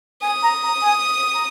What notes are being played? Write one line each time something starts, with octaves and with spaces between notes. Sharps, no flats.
G#5 D#6
A#5
A#5
G#5
A#5